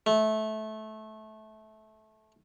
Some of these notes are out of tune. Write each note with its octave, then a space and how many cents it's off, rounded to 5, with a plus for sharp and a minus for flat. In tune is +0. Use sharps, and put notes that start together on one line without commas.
A3 -20